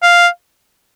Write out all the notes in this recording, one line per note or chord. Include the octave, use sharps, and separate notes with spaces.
F5